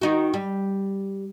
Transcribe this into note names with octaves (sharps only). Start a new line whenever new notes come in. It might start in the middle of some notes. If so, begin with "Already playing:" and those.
D#3 D#4 F#4
G3